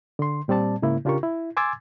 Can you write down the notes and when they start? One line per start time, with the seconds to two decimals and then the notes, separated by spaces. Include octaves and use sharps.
0.19 D3 C6
0.48 A#2 G3 C4 D5 A5
0.82 G#2 C#3 A#3 E4
1.05 C#3 D4 F4 G4 A#4 C#6
1.23 E4
1.57 G#5 C6 D6 E6 G#6 A6